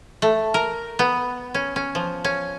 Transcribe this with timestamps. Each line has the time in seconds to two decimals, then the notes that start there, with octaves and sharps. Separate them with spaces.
0.22 A3
0.54 A#4
0.99 B3
1.54 C#4
1.76 C#4
1.95 F3
2.24 C#4